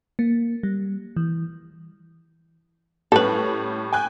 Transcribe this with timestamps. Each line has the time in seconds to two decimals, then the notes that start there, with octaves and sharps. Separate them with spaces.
0.19 A#3
0.63 G3
1.16 E3
3.12 A2 G3 C#4 A4 B4
3.93 G5 G#5 F#6